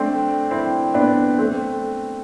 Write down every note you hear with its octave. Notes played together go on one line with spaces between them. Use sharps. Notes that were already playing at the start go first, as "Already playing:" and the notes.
Already playing: A3 C4 D4
C4 E4
B3 D4
A3 C4